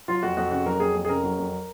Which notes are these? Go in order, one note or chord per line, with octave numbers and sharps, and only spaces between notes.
F#3 F4
F2 F#4
F2 F#4
C#3 F#4
F#3 A#4
F2 G#4
F2
G#4
C#3 A#4
F#3
F2